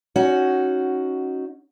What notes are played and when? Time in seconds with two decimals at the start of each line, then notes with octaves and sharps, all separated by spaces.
0.16 C#4 D#4 F#4